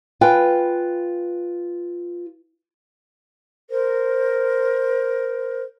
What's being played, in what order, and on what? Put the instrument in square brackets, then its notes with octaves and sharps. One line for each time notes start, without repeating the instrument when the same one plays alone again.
[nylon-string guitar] F4 B4 G5 G#5
[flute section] A#4 C5